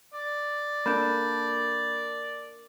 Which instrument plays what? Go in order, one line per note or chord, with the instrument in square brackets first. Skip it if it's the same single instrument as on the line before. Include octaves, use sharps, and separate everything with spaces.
[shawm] D5
[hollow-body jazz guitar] A#3 D4 A4 [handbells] B5 G6